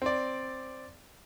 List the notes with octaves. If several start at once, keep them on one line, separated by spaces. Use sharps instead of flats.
C4 D5